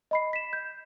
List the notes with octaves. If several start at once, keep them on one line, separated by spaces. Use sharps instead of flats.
D#5 B5 C7
B6 E7
G6